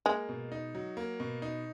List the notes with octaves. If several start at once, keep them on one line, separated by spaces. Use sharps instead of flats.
G#3 A#3
B2
D#4
F#3
A#3
B2
D#4